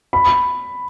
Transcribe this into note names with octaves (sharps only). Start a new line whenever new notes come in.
B5